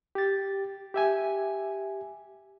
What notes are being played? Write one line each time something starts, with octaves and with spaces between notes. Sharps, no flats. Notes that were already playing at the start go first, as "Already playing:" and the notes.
G4 A6
G4 E5 G#5